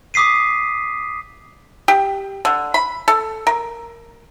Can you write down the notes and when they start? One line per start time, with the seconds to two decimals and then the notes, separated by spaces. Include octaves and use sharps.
0.14 D6 D#6 B6 C7 D#7
1.88 G4
2.45 D3
2.74 B5
3.08 A4
3.47 A#4